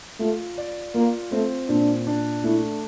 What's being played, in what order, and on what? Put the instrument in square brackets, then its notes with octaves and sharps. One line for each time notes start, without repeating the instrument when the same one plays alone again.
[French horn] A3 [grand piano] F4
[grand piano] D5
[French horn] A#3 [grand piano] F4
[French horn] A3 [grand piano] C4
[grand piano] A#2 [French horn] D4
[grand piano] D4
[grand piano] A3 [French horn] E4